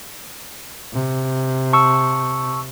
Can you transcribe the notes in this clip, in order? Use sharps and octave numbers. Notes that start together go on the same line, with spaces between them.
C3
A5 C#6 E6